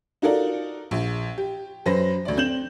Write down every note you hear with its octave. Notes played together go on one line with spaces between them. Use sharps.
D#4 F4 F#4 A4 A#4 D5
A#1
G4
F#2 B4 C5 A#6
D2 D5
C4 G6 E7 F#7